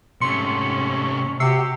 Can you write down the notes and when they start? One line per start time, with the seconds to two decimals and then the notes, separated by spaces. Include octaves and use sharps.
0.21 G#2 C3 A3 C#4 C6 C#7
1.40 C3 F#4 G4 E6 C7 C#7